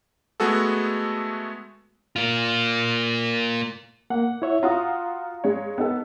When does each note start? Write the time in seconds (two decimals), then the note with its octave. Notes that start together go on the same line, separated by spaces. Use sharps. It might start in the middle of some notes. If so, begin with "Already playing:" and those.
0.40 G#3 A3 B3 F#4 G#4 A4
2.16 A#3 F4
4.10 A#3 F#5
4.42 E4 C#5 E5
4.63 F4 F#4 F5 A#5 D#6
5.44 G#3 C#5
5.78 B3 D#4 A4